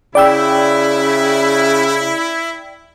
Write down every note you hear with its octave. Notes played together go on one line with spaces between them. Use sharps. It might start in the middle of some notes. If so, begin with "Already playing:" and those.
C#3 E4 D5 G5 E6